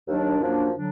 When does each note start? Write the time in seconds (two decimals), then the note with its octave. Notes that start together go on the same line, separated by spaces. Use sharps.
0.08 D#2 D#3 F#3 D4
0.40 F#2 F3 A#3 D4
0.71 D3 F#3 D4